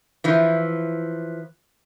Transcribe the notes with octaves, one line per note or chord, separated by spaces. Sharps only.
E3 F3